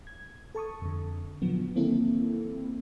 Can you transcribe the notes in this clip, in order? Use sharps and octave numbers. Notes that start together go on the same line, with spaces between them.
G#6
A4 A5 C#6 D#6
F2 D3
A#2 D3 F3 F#3 B3
D#3 A#3 C4 E4 A4